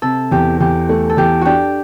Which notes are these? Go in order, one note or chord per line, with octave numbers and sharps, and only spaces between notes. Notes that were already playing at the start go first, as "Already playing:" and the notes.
C3 A4
E2 G4
E2 G4
A3
A4
E2 G4
D4 F#4 G4